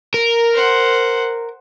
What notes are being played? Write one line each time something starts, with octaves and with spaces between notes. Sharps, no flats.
A#4
C5 F#5